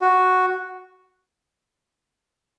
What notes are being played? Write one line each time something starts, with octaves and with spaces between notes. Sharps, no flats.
F#4